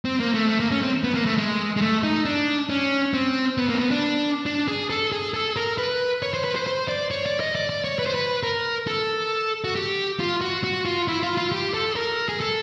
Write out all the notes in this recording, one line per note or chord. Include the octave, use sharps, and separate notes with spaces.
C4
A#3
A3
A3
A#3
C#4
C4
B3
A#3
A3
G#3
G#3
A3
D#4
D4
C#4
C4
B3
A#3
C4
B3
D4
D4
G#4
A4
G#4
A4
A#4
B4
C#5
C5
B4
C5
C5
D5
C#5
D5
D#5
D5
D5
C#5
B4
C5
B4
A#4
A4
F#4
G4
F4
F#4
F#4
F4
E4
F4
F4
G4
A4
A#4
G#4
A4